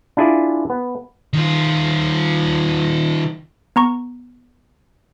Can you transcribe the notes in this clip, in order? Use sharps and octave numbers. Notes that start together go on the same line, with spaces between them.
D4 E4 F4 G#4 D5
B3
D#3 F4
B3 A#5 C#6